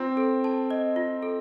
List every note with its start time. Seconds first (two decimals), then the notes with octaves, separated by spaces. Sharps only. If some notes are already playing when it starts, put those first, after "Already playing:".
Already playing: C4 F4
0.17 A4
0.44 A5
0.70 D#5
0.96 F4
1.23 A4